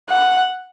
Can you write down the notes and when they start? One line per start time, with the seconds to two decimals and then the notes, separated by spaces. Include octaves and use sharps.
0.09 F#5